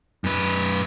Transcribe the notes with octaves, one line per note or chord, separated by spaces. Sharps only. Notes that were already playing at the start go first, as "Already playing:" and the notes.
F#2 B4